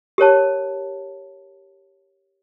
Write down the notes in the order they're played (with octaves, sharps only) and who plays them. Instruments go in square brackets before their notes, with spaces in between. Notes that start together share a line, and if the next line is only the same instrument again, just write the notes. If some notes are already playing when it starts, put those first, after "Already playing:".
[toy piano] G4 A#4 C#5 A5